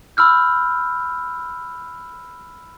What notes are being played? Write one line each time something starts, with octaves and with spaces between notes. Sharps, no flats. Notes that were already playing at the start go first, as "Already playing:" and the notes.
B5 E6 F6 G6